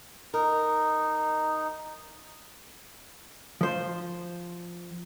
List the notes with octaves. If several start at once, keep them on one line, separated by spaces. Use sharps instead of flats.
D#4 A#4
F3 C5